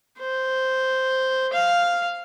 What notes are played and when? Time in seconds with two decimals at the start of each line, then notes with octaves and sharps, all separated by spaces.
0.19 C5
1.53 F5